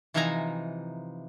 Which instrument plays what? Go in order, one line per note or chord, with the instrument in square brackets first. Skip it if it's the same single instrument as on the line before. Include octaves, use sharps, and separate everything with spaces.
[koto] C3 E3 F3 D#4 G#5 A#5